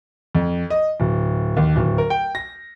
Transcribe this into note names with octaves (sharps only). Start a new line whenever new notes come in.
F2
D#5
D1
D#2
D1
A#4
G5
A#6